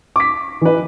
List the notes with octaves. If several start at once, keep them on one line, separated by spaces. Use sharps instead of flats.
D6 B6
E3 B4